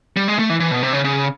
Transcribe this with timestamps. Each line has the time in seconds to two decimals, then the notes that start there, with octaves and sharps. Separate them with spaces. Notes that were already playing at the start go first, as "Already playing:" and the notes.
0.17 G3
0.28 G#3
0.39 A3
0.50 E3
0.60 E3
0.71 B2
0.83 C3
0.93 C#3
1.04 C#3